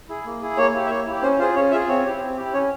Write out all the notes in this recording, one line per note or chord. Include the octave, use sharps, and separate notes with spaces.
E4 G#4
A#3
E4 G#4
A#3 C#5
E4 G4
E5
A#3 C#5
E4 G4
C#4 C5
F4 G#4 C5
C#4 C#5
F4 G#4 E5
C4 C#5
E4 G4
C4
E4 G4
C#4 C#5